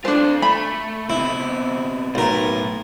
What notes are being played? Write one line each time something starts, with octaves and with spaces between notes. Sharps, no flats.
D4 F4 A4 C5
A3 B5
B2 C4 E4
B1 A2 A#4